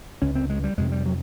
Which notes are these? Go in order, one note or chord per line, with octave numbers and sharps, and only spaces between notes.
C#2 C3 C#4
C4
G#3
G3
F2 C3 G#3
G3
F#3